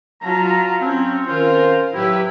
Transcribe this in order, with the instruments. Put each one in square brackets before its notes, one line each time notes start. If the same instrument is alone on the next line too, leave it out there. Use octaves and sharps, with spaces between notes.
[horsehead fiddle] F#3 F4 [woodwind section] A5 A#5
[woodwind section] C4 [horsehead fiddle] C#4
[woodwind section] D#3 C#4 C5 [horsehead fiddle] F4 A#4
[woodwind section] A2 F#3 E4 [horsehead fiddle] G4 B4